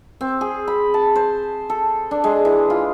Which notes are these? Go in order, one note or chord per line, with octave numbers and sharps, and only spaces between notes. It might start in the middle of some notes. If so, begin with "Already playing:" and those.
C4
G#4
B5
A5
C5
A4
D4
G#3
E3
F4